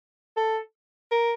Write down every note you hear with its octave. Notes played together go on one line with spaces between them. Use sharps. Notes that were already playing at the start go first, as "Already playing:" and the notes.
A4
A#4